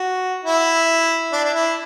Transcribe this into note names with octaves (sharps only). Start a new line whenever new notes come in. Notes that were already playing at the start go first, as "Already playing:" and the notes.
Already playing: F#4
E4
D4
D4
E4